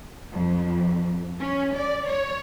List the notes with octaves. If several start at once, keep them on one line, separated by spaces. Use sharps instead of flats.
F2
C#4
D5
C#5